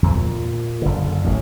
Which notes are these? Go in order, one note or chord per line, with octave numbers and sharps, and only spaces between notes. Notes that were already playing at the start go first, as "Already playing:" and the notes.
E2 D3 F3
A#2
F#1 D3
A1 F2 A2